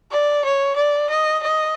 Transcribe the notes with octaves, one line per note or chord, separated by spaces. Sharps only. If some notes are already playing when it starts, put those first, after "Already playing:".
D5
C#5
D5
D#5
D#5